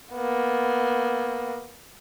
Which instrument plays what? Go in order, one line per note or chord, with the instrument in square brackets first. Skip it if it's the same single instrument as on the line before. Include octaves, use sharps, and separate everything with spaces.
[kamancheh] A#3 B3